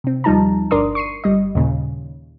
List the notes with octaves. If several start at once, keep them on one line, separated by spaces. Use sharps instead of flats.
C3 C4
D#2 F3 G3 D#4 A5 A#5
G1 D4 A#4 D5 C6 D#6
C#6 C7 C#7 D#7
G1 G3 D#5
D#2 A#2 C#3